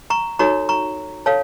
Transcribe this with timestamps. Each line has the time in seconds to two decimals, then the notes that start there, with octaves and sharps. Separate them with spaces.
0.10 A#5 C#6
0.39 D#4 F#4 A4 C#5 A#5 C#6
0.69 A#5 C#6
1.26 A4 C#5 F5 A5